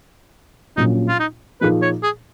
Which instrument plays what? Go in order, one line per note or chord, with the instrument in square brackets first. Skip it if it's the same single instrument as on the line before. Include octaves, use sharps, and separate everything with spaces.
[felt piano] A#1 A#2 F#3 C#4 [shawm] D#4
[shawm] F4
D#4
[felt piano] A#2 F3 A#3 D#4 G#4 [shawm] B4
[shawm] C#5
G#4